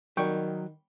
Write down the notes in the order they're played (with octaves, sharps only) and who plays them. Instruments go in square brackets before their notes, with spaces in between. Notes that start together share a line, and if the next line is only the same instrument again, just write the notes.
[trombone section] D#3 [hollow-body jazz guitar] F#3 [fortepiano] G3 G5 C#6